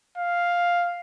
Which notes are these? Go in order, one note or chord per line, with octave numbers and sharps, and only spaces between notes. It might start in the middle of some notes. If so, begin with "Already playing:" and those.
F5